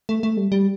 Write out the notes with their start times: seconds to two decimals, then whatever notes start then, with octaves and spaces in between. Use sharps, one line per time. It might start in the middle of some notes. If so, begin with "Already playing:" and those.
0.09 A3
0.23 A3
0.37 G3
0.52 G3